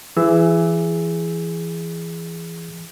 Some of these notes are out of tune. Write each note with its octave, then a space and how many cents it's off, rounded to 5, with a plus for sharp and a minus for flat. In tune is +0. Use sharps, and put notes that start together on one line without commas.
E3 +25 G#4 +0 E6 -5